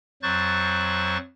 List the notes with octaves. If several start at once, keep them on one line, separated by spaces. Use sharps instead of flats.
F2 F#3 C5 C#6 F#6 A6